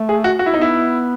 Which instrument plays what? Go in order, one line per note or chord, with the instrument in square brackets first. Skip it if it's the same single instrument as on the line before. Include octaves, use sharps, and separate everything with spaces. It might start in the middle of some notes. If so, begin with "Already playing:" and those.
Already playing: [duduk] A3
[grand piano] G#4
F#4
F#4
E4
[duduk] B3 [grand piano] D#4
[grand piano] E4